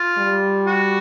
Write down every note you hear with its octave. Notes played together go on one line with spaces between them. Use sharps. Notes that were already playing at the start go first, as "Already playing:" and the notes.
Already playing: F4
G3
F#4